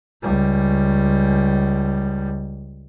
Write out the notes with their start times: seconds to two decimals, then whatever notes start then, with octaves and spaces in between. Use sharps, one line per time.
0.22 C#2 G3